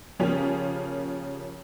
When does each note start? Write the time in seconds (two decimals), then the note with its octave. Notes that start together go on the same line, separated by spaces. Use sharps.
0.19 C#3 F3 A#3 C#4 F4 G4